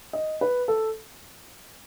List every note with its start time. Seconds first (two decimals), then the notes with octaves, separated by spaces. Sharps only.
0.13 D#5
0.41 B4
0.68 A4